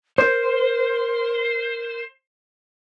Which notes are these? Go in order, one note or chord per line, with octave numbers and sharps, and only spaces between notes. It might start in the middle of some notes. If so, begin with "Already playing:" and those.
A#4 C5